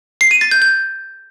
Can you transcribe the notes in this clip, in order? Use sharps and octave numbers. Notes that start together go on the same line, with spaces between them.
C7
D#7
A6
G6
G6